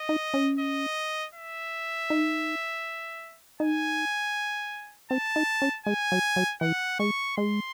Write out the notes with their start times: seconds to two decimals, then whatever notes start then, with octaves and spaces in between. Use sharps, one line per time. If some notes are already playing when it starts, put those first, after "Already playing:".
Already playing: D#5
0.09 D#4
0.34 C#4
0.59 D#5
1.35 E5
2.10 D#4
3.60 D#4 G#5
5.11 C4 A5
5.36 D#4
5.62 C#4
5.86 G#3 G#5
6.12 F#3
6.36 F#3
6.61 E3 F#5
6.99 G#3 C#6
7.37 G#3 C6